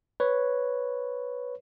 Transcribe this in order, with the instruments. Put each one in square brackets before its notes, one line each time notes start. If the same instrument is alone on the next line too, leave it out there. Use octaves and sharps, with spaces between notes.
[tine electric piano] B4 C#5